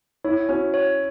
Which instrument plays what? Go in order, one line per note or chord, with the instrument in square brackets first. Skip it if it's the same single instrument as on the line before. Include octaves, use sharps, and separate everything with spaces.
[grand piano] E4 [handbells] C#5
[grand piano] C#4 [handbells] F#4
[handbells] C#5